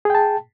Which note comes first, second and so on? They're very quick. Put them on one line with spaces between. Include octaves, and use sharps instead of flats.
G#4 G5 A5